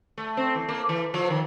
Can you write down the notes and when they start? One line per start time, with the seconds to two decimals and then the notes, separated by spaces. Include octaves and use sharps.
0.18 A3
0.37 C4
0.55 E3
0.69 A#3
0.89 E3
1.14 F3
1.30 D#3